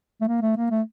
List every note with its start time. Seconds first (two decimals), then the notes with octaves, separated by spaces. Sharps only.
0.21 A3
0.28 A#3
0.41 A3
0.56 A#3
0.71 A3